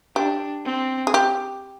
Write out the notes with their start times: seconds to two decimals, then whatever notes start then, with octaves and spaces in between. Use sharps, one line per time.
0.15 D4 G4
0.66 C4
1.07 G#4
1.14 G4